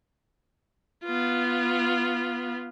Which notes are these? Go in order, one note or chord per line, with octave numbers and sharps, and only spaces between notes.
B3 F4